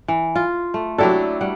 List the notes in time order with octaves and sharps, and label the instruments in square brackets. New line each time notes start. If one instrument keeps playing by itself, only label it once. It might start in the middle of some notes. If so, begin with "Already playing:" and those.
[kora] E3
F4
A3
[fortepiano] F#3 G4 A4 [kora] D4 E4
[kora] G3 F#5